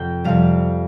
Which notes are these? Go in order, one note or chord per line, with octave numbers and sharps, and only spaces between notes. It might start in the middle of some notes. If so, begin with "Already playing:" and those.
Already playing: F2 C3 G5
F2 C3 G3 F5